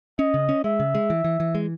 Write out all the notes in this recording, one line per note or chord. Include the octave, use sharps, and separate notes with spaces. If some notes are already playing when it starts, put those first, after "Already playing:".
C#4 D#5
C#3
C#4
G#3 E5
C#3
G#3
E3
E3
E3
G#3